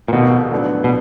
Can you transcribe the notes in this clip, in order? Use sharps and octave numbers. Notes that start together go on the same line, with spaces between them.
A#2
F1 D#2 B2 D#3
A#1 A2 F#3 B3 D4
B2